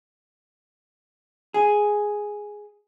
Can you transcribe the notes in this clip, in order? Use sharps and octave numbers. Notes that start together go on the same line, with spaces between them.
G#4